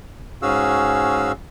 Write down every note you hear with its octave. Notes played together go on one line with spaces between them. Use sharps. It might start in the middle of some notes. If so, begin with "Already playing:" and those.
G#2 C#4 F#4 G#4 F5 E6